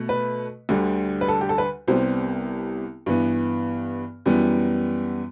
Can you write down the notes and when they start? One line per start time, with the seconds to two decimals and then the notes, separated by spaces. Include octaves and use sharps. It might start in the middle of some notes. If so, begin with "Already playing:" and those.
Already playing: B2 A3
0.09 B4
0.69 D2 D3 G3
1.21 B4
1.28 A4
1.41 G4
1.49 A4
1.58 B4
1.88 C2 C3 G3 B3 C5
3.06 G2 E3 B3
4.26 F#2 E3 G3 B3